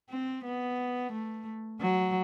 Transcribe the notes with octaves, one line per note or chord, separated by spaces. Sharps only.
C4
B3
A3
F#3